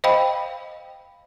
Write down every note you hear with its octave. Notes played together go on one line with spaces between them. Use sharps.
C5 D#5 F5 G5 B5